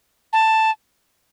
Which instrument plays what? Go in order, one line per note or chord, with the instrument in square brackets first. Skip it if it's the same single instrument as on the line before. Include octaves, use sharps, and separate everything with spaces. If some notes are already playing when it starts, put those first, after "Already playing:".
[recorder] A5